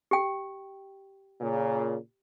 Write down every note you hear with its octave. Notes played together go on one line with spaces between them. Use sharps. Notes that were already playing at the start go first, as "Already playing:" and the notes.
G4 G5
A#2 C#3